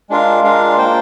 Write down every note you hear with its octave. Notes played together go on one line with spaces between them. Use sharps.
G#3 D4 F4 A#4 F5
G#3 D4 F4 A#4 F5
A#3 F4 C5 G5